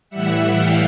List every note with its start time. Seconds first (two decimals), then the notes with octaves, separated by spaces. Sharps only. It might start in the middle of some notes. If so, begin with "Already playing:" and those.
0.10 A2 E3 G3 E5 F#5
0.53 F5 G5